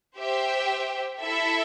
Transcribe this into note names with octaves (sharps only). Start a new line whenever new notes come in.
G4 C5 E5 G5
E4 A4 E5